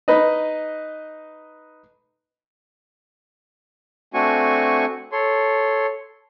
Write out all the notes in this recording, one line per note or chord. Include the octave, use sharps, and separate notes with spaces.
D#4 B4 D#5
A3 C4 D4 F#4 G#5 C#6
A4 C#5 C6